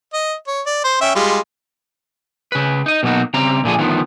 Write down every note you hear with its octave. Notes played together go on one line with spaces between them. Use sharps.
D#5
C#5
D5
C5
C#4 E5 G5
G3 G#3 F4
C#3 B4
D#4 D#5
B2 F#3 A#3 D#4 F#4
C#3 G3 C4 A#5
A#2 D3 F3 G#4
D2 D#3 F3 B3